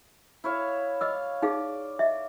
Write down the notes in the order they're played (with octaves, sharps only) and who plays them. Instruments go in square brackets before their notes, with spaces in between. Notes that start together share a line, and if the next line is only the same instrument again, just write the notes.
[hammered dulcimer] E4 C#5 F5
[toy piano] D#5 D6 E6 [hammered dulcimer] F5
[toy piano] D#4 G#4 F5 [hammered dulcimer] D5
[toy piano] D#5 E5